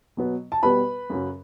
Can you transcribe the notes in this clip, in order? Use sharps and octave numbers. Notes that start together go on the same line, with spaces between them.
B2 F#3 B3
A5
B2 G3 B3 B4 B5
F#2 C#3 F#3